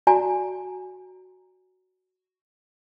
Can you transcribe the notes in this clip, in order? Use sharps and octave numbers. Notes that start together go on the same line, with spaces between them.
F#4 D5 G#5 A#5